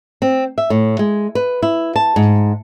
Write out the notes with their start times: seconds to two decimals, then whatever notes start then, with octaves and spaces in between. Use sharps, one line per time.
0.22 C4
0.58 E5
0.70 A2
0.99 G#3
1.35 B4
1.62 E4
1.96 A5
2.16 G#2